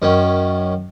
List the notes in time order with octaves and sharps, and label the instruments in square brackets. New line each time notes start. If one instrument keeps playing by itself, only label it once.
[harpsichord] F#2 D#3 C#4